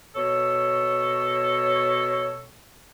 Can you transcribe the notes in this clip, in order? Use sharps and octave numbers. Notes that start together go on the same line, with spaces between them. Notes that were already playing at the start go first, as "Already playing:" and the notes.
B2 A4 C#5